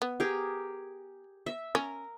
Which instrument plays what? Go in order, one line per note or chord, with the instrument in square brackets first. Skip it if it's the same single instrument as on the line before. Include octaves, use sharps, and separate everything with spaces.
[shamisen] B3
[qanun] G4 G#4 A#4
E5
[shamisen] C#4 [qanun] A#4